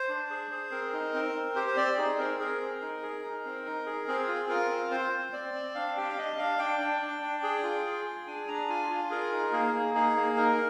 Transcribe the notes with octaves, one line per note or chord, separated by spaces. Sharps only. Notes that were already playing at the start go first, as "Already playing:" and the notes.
Already playing: C5
D4
G#4
G#4
C4 A#4
D#4
C4
C4
G4 C5
C5
C4 D5
D#4 G#4
C4 A#4
G#4 A#4
C4
D#4
G#4
D#4
C4
D#4
G#4
C4 G#4
F4
F4 A#4
C4
C4 C5
C4
C4 D5
C4
D4 F5
G4 G5
F5
D4 D#5
D4 F5
D4 G5
D4
D4
D4
G#4
F4
G#4
G#4
D4 G#5
D4 A#5
F4 G#5
F4
G#4 A#4
D#4
A#3 G#4
A#3
D#4 G#4
A#3
D#4 A#4